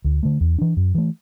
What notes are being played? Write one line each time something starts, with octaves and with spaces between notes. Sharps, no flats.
D2
D3 A3
E2
E3 D4
F#2
E3 A3